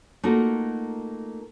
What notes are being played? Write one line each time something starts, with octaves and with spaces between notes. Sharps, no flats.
A3 A#3 D#4 F4 F#4